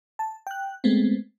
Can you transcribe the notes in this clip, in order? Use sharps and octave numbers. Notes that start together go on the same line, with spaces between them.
A5
G5 F#6
G#3 A3 B3 C4